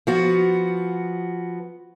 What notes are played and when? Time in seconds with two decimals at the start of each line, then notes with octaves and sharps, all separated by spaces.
0.07 F3 B3 F#4